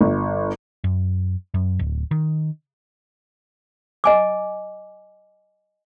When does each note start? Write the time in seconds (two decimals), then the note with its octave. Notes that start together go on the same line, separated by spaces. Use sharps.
0.01 G1
0.84 F#2
1.54 F#2
1.79 D1
2.11 D#3
4.04 D#5 G#5 D6